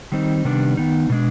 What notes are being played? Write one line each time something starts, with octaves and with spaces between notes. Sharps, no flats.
D#3 G3 C4 D#4
C3 D#3 G3 B3 D4
D#3 B3 D#4
B2 G#3 D4